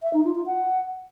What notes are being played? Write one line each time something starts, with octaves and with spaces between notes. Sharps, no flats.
E5
D#4
F4
F4
F#5